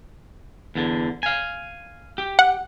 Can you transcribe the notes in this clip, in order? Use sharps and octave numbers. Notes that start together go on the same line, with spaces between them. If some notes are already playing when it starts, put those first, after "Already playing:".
E2 D3
F5 G#5
G4
F#5